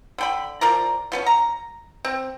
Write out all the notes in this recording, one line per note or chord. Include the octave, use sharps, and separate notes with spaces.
D3 G5 B5
F3 A#4 D5 A#5
F3 B3 C#4
A#5
C4